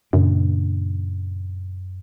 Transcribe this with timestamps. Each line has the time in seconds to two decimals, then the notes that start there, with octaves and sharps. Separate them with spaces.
0.13 F#2 A#2 C#3 D4